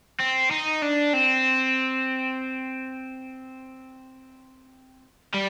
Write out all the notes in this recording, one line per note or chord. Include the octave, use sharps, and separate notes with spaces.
C4
D#4
D4
C4
G3